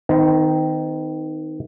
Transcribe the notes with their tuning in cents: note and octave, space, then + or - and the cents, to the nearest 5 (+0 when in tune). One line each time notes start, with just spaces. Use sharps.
D#3 +5 C4 -40